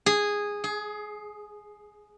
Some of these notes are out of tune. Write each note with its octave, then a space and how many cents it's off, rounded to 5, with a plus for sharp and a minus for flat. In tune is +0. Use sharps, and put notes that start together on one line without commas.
G#4 -10
G#4 +20